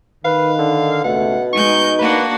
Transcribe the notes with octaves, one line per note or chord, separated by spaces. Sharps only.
D#3 B4 F5
D3
G#1 C#2 B2 A3 F#5
G#3 D#4 C#6 G6
A#3 D4 F#4 B4